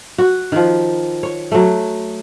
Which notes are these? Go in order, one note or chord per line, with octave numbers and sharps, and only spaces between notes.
F#4
D#3 F3
C#5
F#3 A3